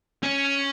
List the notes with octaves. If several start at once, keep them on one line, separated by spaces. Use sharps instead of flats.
C#4